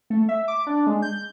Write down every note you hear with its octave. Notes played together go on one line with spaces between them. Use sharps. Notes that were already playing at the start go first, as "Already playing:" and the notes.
A3
E5
D6
D4
G#3
G6